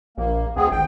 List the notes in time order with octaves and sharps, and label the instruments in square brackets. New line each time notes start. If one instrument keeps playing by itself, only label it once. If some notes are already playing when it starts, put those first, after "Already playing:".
[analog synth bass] A#1 [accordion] A#3
[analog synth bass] D2 [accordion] B3 C4 G#4
[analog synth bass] G#1 [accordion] G5